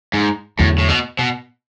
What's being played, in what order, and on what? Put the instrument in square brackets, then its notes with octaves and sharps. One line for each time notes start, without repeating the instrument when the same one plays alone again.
[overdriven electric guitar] G#2
[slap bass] E2 D3 F#3 [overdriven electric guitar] A2
[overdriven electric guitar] A2
B2
B2